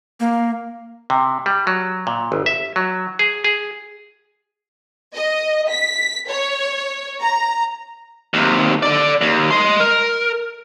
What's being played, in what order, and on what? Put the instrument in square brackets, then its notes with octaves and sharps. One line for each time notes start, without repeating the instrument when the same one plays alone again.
[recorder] A#3
[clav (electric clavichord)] C3
G3
F#3
A#2
G1
E5
F#3
G#4
G#4
[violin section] D#5
B6
C#5
A#5
[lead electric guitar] D#2 C3
A4 D5
D#2
D#5 C6
A#4